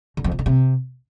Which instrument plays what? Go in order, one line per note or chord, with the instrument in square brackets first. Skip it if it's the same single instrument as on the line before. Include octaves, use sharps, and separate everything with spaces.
[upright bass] D3
F2
C3
D3
C3